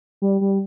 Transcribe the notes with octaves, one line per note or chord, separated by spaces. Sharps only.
G3
G3